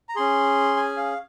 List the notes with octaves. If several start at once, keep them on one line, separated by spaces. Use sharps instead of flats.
A#5
C#4 G#4 C6
G#5
F5